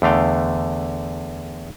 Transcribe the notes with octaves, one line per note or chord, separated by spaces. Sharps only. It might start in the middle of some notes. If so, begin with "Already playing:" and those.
E2 D3 A3 F5 G5